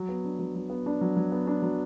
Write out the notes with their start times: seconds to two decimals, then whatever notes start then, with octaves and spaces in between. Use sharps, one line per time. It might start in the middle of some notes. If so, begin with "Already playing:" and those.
Already playing: F#3
0.09 B3
0.24 D4
0.39 F#3
0.55 F#3
0.70 B3
0.86 D4
1.01 F#3
1.16 F#3
1.32 B3
1.47 D4
1.62 F#3